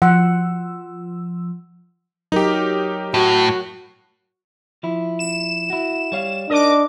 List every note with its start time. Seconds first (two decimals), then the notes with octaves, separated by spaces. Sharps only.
0.02 F3 F#5 E6
2.32 F#3 D#4 G4 A#4
3.14 A2 F#4
4.83 F3 E4
5.19 E7
5.70 E4 F#4
6.12 G3 C#5 F5
6.50 D4 D#4 A#4 D5 D#5 D6